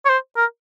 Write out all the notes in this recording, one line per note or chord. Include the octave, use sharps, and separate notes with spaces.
C#5
C5
A#4